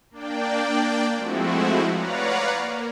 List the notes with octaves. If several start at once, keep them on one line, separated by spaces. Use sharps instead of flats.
A#3 D4 D5 G5
F3 G#3 A3 C4 E4 F#4
B4 C#5 D5 F5 F#5 A#5
A#3